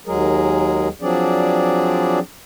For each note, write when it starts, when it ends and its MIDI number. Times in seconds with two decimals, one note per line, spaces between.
0.07 0.88 39
0.07 0.88 54
0.07 0.88 56
0.07 0.88 68
0.07 0.88 70
1.02 2.19 53
1.02 2.19 54
1.02 2.19 60
1.02 2.19 62
1.02 2.19 68
1.02 2.19 74